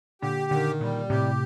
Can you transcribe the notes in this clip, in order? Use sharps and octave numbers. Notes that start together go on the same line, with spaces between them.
A#2 D3 G4
A#2 D3 D#3
A#2 G3
A2 C3 G4